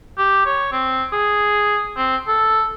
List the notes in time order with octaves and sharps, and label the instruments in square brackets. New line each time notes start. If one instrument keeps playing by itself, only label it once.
[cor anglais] G4
C#5
C4
G#4
C4
A4